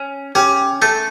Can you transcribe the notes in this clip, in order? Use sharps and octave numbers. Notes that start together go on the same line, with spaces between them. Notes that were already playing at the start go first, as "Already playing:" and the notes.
Already playing: C#4
C#4 G4
A3 A4